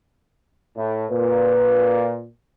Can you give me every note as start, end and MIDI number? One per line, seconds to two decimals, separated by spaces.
0.76 1.06 45
1.11 2.27 46
1.11 2.21 71